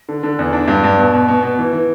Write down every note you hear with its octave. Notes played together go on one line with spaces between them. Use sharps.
D3
D3
E2
D4
G2
G2
B2
B2
B2
B2
E3
E3